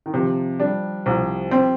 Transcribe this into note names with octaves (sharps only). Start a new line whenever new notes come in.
D#3
C3 F3
G3 D4
C2 F3
C4